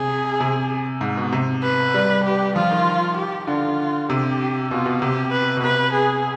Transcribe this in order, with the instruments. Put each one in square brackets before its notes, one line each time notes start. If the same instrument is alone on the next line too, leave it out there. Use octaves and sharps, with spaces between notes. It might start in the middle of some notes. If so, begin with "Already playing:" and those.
Already playing: [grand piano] C3 [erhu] G#4
[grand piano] C3
G#2
B2
C3
[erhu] B4
[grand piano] G3
[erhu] G4
[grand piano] F3 [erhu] F4
[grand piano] D#3
[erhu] G4
[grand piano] D3 [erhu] F4
[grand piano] C3 [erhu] G4
[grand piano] B2 [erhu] F4
[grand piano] B2
[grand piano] C3 [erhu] G4
[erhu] B4
[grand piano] B2
[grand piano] C3 [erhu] B4
[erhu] G#4